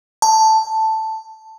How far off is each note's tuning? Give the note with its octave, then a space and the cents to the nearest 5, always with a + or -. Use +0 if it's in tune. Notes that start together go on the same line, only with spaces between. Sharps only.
A5 +5